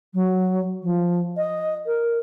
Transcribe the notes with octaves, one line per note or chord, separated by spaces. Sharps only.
F#3
F3
D#5
A#4